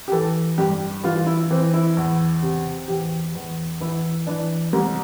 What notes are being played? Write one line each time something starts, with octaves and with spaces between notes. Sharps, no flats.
G4
E3 A4
G2 G4
E3 F4
F4
E4
E3 C4
E4
E2
C3
E2 G4
E2
E3 E4
E3 D4
C2